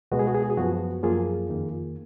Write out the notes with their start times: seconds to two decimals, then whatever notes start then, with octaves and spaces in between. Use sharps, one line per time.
0.12 C#2 B2 G#3 B3 F#4
0.19 G#4
0.27 F#4
0.34 G#4
0.42 F#4
0.50 G#4
0.57 F#2 F3 B3 F#4
1.03 F#2 F3 A#3 F4 G#4
1.49 F2 D#3 A#3